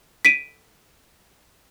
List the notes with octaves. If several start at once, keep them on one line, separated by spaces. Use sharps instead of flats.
B6 D7 D#7